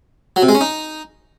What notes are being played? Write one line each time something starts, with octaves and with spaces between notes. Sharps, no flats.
F#3
C3
G#3
C#4
D#4